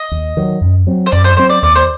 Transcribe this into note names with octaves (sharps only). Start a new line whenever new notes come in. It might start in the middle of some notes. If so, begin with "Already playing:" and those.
Already playing: D#5
D#2
D#3 F#3
F#2
F#3 C4
C5
F#2 D5
C5
F#3 C4 C5
D5
D#2 D5
C5